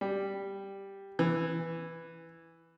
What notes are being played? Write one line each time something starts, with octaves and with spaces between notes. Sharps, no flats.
G3
E3